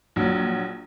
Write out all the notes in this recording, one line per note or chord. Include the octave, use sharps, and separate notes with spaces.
A#1 F#3